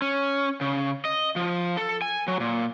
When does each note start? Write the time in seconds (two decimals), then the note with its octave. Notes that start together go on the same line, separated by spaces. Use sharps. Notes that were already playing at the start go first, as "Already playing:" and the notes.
0.02 C#4
0.61 C#3
1.05 D#5
1.36 F3
1.77 A4
2.02 G#5
2.28 F#3
2.40 A#2